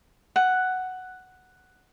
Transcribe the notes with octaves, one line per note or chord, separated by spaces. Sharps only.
F#5